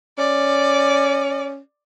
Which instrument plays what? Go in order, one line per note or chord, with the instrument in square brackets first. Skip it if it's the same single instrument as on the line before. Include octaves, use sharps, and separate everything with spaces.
[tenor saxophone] C#4 [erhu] D5